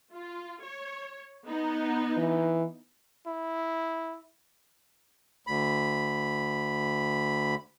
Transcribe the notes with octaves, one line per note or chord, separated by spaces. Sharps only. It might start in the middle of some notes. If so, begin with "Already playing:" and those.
F4
C#5
B3 D#4
E3
E4
D2 B5